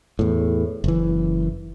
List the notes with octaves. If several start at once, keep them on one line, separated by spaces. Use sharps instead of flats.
E2 A2
F#1 E3